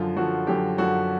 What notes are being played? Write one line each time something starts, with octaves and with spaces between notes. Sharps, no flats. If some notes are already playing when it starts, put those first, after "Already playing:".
Already playing: F#2 D3 F3 F4
F#2 D3 F3 F#4
F#2 D3 F3 G4
F#2 D3 F3 F#4